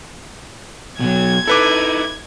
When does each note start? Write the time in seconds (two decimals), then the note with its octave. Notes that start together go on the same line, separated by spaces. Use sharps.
1.00 B2 F#3 G#6
1.47 D#4 E4 A4 B4 D6